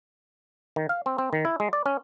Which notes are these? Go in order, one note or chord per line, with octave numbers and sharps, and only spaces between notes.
D#3
F5
C4
C4
D#3
E4
G#3
D5
C#4